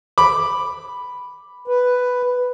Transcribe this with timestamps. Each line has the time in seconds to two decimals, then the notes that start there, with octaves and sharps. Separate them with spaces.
0.18 B5 D6
1.68 B4